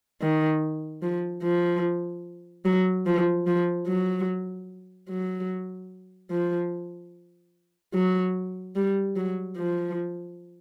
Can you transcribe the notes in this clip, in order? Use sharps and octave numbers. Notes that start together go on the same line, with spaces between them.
D#3
F3
F3
F#3
F3
F3
F#3
F#3
F3
F#3
G3
F#3
F3